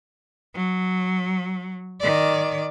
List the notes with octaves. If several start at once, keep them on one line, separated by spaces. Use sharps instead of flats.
F#3
D#3 D5